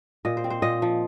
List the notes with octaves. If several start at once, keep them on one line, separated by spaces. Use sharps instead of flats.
A#2 D#5
C5
C4
C5
A#2 D#5
F3